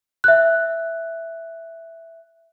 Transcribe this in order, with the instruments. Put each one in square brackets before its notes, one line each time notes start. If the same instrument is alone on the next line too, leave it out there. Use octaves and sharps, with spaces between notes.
[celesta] E5 F#6